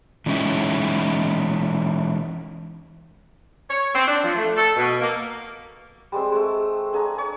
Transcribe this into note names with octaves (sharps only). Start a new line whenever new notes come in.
E3 G#3 C#4 D#4 E4
C#5
C4
D4
F3
A3
A4
B2
A#3
G3 G#3 C4
G#3 A3
D4 G#4 G#5 A#5
C#5